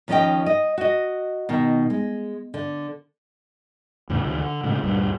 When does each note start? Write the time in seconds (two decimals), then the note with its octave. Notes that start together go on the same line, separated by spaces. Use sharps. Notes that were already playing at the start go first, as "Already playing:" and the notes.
0.08 D#2 F3 C#4 A#4 D#5 G5
0.46 D#5
0.78 F#4 D#5
1.49 B2 D#3
1.90 G#3
2.54 D3
4.09 E2 A2 C#3
4.24 D2 D3 D#3
4.38 D3
4.64 A2 C#3 G#3
4.84 D2 G2 A#2 G3